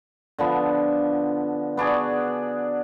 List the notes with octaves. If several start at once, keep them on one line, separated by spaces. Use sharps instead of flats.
D3 F3 B3
B3 D4 F#4 G#4